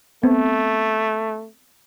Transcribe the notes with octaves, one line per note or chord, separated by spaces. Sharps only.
A3 B3 C4